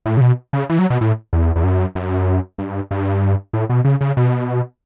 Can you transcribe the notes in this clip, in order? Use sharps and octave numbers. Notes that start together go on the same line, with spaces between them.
A2
C#3
B2
C#3
E3
F#3
B2
A2
E2
E2
F#2
F#2
G2
G2
A2
B2
C#3
C#3
B2